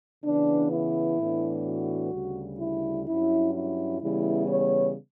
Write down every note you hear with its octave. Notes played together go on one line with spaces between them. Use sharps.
C#3 E3 B3 D4
E4
A2 E3 B3 D4
F#4
D2 C#3 G3
E4
G2 F#3 C#4 E4
E4
C#3 E3 G3 B3 E4
C#5